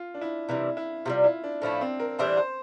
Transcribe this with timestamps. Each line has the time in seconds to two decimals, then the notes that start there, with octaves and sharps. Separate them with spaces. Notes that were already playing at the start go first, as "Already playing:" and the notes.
Already playing: F4
0.14 D4
0.21 E4
0.49 C3 E3 G3 E4
0.77 E4
1.05 C3 E3 G3 F4
1.24 E4
1.43 D4
1.62 A2 F3 A3 D4 E4
1.81 C4
2.00 A#4
2.19 A2 E3 G3 D4 C5
2.37 C5